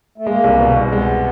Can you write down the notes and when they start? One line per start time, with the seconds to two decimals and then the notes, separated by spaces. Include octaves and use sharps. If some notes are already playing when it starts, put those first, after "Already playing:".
0.18 A3
0.26 G#3 A#3
0.44 C2
0.60 B2
0.76 C2
0.92 G#3 B3